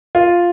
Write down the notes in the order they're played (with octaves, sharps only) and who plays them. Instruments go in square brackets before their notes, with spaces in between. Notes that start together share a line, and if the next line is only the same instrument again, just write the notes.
[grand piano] F4